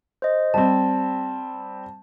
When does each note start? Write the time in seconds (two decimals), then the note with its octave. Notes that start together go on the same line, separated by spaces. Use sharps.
0.22 C5 D#5
0.54 G3 C4 A5